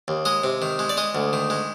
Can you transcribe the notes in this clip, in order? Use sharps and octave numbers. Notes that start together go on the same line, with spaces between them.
D#2
G#3 D#5
C3
D#3
G#3
D5
G#3 D#5
D2
D#3
G#3